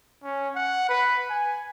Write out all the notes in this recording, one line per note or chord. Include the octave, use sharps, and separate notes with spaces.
C#4
F#5
B4
G#5